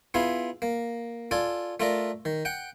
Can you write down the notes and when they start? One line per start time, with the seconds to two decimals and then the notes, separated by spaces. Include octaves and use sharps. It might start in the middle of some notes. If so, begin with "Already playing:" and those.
0.14 B3 E4 F4 G#4 F5
0.62 A#3
1.31 F4 A4 D5 G#5
1.80 A3 F4 A4 A#4 D5
2.25 D#3
2.45 F#5 G5